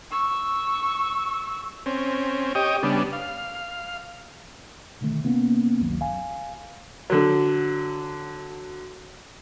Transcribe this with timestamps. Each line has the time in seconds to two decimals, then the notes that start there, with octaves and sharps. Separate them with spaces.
0.11 C#6 E6
1.86 C4 C#4
2.55 G4 C#5 D#5 G5 D#6
2.83 C#3 G3 B3 D4
3.13 F5
5.01 B2 D3 D#3 A3
5.24 C3 A#3 B3 C#4
5.81 G#1 D2 G2 D#3 F#3
6.00 A#1 F5 G#5
7.10 D3 F#3